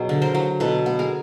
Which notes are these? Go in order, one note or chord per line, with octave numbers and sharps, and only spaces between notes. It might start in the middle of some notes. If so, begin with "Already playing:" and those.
Already playing: B2 F#3 G#4
D3
A#4 C5
F#3
B2 A4 B4
B3
G#4 A#4